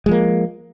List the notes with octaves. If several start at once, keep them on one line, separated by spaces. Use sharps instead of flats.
F3 G#3 A#3